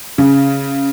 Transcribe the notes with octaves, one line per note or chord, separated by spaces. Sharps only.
C#3